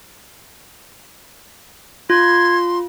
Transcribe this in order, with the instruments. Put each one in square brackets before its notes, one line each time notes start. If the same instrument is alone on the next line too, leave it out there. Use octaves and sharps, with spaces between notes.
[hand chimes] F4 [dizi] C6 [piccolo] G#6